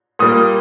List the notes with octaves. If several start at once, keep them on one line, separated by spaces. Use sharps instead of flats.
A#2 G3 A#3 D#6